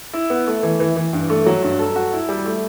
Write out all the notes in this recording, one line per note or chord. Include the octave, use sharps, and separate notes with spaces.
E4
B3
A3
E3
E3
E3
G2
A3
F#3
G2
A4
F#4
E4
G3
A3